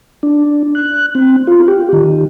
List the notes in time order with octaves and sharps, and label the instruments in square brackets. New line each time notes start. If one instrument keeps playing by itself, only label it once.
[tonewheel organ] D4
F#6
C4
F4
G4
D#3